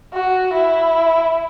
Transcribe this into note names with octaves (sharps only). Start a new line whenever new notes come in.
F#4
E4